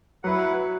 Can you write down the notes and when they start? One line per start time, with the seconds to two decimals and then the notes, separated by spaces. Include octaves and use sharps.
0.23 F#3 E4 B4 F#5